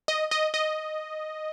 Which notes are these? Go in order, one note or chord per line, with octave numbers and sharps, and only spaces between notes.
D#5
D#5
D#5